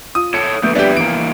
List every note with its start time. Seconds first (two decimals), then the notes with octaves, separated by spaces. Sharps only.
0.15 F4 D#6
0.34 A4 C#5 A5 C#7
0.63 A#1 D3 A3 B3 G6
0.75 G3 D4 G4 B4 E5
0.97 E3 A#3 D7